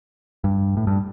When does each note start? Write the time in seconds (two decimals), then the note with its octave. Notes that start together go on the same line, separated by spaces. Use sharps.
0.44 G2
0.77 A2
0.87 G2